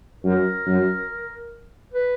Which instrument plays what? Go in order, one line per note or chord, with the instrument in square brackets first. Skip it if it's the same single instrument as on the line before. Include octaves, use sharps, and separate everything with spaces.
[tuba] F#2 [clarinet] A#4
[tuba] F#2
[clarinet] B4